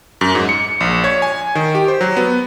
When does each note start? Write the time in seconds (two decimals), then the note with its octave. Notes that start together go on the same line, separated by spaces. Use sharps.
0.21 F#2
0.35 G#2
0.49 C#7
0.80 A#1
1.04 C#5
1.22 G#5
1.55 D#3
1.75 G4
1.88 C5
2.01 F#3
2.17 B3